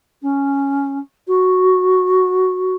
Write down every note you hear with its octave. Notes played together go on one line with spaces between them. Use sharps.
C#4
F#4